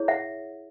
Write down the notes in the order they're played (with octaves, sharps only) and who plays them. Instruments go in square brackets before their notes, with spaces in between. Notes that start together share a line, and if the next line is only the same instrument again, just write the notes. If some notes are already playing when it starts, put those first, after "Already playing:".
Already playing: [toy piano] E4 G#4 C#5
E5 F#5